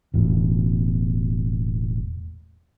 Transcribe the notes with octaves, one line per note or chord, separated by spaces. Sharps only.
E1 A1 A2